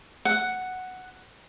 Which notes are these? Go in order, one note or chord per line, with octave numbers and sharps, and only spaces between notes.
F#5